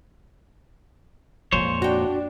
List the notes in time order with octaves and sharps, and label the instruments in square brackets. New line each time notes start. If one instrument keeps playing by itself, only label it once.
[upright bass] F2 G#3 [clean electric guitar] A#2 C5 C#5
[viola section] D4 [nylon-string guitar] F#4 G5